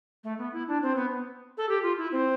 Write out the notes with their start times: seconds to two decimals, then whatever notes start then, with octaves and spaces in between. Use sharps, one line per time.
0.24 A3
0.38 B3
0.53 E4
0.68 D4
0.83 C4
0.96 B3
1.57 A4
1.69 G4
1.83 F4
1.98 E4
2.12 C4